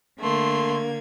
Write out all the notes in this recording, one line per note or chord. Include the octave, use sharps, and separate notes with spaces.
D3 A3 A#3 C6 G#6